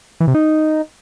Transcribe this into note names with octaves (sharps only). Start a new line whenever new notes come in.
E3
C3
D#4